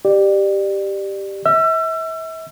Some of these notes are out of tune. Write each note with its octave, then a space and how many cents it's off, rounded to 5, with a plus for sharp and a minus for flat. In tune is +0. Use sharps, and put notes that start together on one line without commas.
G4 +0 D5 +25
E5 -35 E6 +35